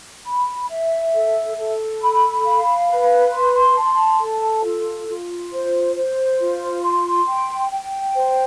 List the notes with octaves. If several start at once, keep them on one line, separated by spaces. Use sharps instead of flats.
B5
E5
A4
A4
B5
F5
B4
C6
A5
A4
F4
F4
C5
C5
F4
C6
G5
G5
C5